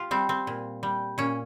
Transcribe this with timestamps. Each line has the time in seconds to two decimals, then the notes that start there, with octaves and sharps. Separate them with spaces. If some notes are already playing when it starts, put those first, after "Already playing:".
Already playing: F4 G4
0.11 G3 C4
0.29 C4
0.47 A#2
0.83 G3
1.18 A#2 C#4